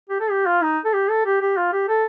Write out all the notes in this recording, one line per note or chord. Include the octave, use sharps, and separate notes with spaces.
G4
A4
G4
F4
D#4
A4
G4
A4
G4
G4
F4
G4
A4